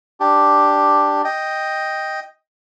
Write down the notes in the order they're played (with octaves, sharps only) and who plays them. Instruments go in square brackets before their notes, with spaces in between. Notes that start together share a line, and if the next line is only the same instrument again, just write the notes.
[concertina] D4 G4
D#5 G5